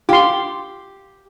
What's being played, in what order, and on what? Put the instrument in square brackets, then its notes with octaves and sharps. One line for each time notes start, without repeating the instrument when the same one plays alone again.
[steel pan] F4 C6 [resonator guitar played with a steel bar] G4